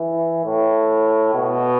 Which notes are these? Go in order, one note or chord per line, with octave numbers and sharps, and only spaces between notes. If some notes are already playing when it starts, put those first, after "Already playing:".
Already playing: E3
A2
B2